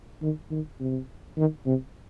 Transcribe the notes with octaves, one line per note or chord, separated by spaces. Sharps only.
D#3
D#3
C3
D#3
C3